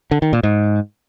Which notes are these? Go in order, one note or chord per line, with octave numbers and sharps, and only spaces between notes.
D3
D#3
A#2
G#2